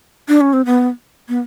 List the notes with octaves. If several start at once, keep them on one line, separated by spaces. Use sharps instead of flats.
D4
C#4
C4
B3
B3